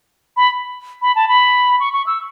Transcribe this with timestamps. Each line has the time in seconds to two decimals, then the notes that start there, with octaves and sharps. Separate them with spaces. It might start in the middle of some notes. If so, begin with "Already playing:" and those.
0.37 B5
1.02 B5
1.16 A5
1.28 B5
1.80 C#6
1.93 C#6
2.06 E6